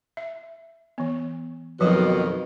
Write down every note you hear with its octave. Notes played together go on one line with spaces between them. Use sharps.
E5
E3 B3
F2 B2 D#3 F3 F#3 F#4